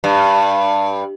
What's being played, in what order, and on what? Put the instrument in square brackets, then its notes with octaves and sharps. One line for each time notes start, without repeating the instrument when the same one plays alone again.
[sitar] G2